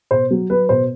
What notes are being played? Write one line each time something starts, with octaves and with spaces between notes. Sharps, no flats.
B2 C5
F#3
F#3 B4
B2 C5